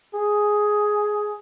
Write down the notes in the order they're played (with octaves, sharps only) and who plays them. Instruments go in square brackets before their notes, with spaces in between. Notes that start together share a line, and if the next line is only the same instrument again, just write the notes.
[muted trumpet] G#4